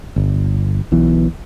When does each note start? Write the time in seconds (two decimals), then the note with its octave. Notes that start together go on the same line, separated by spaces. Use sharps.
0.16 G1
0.92 B1 B2 E3